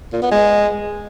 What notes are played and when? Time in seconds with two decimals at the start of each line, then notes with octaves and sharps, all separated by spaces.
0.13 A#2
0.22 B3
0.32 G#3